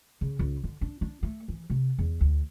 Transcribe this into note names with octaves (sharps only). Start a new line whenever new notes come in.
C#3
C#2
D3
D4
D4
A3
E3
C3
E2
D2